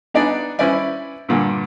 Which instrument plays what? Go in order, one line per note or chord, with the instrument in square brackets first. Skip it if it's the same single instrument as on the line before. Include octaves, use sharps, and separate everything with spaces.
[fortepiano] B3 D4 D#4 D5 G#5
C#4 E4 B4 C5 D5 G#5
G2 A#2 D3